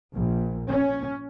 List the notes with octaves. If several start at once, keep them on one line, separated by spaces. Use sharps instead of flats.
A#1
C#4